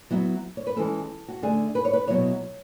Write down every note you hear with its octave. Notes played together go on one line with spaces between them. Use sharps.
F#3 B3 E4
C#5
B4
E3 G#3 C#4 A4
F#4
D3 A3 D4 G#4
B4
C#5
B4
B2 F#3 B3 E4 C#5